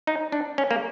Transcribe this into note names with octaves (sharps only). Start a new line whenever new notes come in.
D#4
D4
C#4
A#3